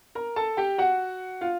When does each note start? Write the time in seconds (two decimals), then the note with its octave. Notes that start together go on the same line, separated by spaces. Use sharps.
0.15 A#4 A#5
0.36 A4 A5
0.57 G4 G5
0.78 F#4 F#5
1.41 F4 F5